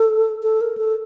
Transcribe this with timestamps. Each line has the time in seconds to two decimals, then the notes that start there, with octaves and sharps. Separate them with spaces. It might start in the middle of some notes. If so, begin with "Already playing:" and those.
Already playing: A4
0.43 A4
0.61 A#4
0.78 A4